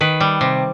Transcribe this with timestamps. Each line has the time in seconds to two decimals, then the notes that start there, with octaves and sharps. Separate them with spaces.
0.01 D#3 B4
0.20 G3
0.41 C3